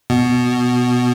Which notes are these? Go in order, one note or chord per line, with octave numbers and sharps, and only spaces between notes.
B2